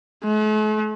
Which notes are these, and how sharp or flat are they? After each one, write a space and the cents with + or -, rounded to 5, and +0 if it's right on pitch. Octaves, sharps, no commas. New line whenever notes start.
A3 -45